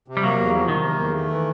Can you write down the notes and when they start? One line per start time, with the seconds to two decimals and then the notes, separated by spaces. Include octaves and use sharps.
0.08 C3
0.17 G3
0.23 F#3 A#3
0.38 E2
0.54 F3
0.68 C3 D#3
0.84 A#3
0.99 E2
1.14 A3
1.30 E3